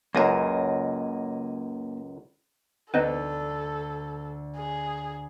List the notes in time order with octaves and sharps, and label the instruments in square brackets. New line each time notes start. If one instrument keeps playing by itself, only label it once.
[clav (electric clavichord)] C#2 F#2 [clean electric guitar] A#3 D#5 G#5
[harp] D2 [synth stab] B3 C4 D#4 [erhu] A4
[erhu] G#4